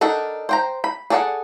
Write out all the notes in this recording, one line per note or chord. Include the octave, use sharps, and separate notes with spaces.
D4 D#4 A4 A#4 F#5
C5 G5 A#5
B5
G#4 A4 D5 E5 F#5